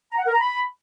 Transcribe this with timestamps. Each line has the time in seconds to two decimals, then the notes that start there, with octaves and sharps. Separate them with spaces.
0.12 A#5
0.19 F#5
0.26 A#4
0.33 A#5
0.40 B5